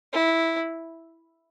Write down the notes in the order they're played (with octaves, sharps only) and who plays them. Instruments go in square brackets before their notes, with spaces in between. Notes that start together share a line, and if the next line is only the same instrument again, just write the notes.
[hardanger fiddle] E4